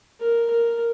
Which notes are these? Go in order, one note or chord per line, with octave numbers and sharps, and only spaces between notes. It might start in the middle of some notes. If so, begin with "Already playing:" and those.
A#4
A#4